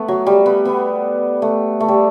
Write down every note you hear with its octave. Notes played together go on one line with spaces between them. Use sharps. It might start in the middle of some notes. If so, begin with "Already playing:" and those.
Already playing: A3 B3
F#3
G3
B3
B3
A3
A3
G3